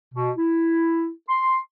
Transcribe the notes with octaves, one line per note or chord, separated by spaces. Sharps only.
B2
E4
C6